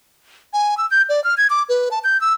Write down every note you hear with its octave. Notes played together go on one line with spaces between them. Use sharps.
G#5
E6
G6
D5
F6
G#6
D6
B4
A5
G6
E6